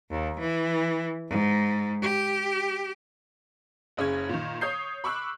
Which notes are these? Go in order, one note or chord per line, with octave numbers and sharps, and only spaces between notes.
D#2
E3
G#2
G4
F#1 C#3 C#4 G#6
A#2 D#3
C#5 D#6 G6 C7
B5 C#6 D6 E6 F#6